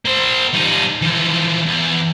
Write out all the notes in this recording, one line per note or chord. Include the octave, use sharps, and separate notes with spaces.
A#3 C5
G3 D#4
E3 F3
E2